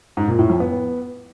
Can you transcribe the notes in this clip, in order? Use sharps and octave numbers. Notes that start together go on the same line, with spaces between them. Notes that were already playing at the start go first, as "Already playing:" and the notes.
G#2
A#2
A2
F2
B3